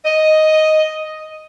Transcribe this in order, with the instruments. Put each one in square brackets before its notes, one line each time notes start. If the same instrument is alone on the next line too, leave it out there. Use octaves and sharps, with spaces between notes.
[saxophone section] D#5